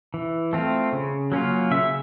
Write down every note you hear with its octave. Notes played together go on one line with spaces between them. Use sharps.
E3
A3 C4 F4
C#3
F#3 A#3 C#4 F4
C#3 E5